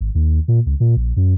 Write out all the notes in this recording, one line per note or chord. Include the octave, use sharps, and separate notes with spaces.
G#1
D#2
A#2
C#2
A#2
A#1
F#2